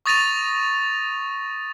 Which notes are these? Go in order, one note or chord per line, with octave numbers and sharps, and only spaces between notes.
C#6 D#6 A6 A#6 D#7 F7